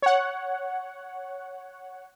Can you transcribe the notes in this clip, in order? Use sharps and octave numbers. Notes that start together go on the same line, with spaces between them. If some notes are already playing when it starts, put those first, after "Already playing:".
C#5 F#5